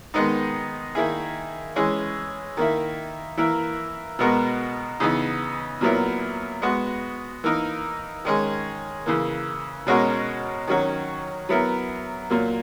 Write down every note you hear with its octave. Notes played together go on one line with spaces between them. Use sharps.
D#3 G#3 B3 D#4
D#3 A#3 E4 G#4
E3 G#3 C#4 G#4
D#3 A#3 E4
E3 A#3 E4 A#4
B2 G#3 B3 F#4 A#4
C#3 E3 B3 D#4
A#2 F#3 B3 E4 A#4
G#3 B3 F#4
E3 A#3 D#4 A#4
D#3 G#3 C#4 G#4
C#3 E3 A#3
B2 G#3 C#4 F#4 A#4
D#3 F#3 C#4 F#4
F#3 B3 E4 A#4
A#2 F#3 A#3